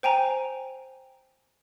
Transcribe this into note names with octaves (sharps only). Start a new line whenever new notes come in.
C5 G5 G#5 A#5